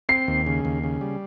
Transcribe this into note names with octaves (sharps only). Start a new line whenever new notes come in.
C4 C7
D#2
C#3
D#2
C#3
G3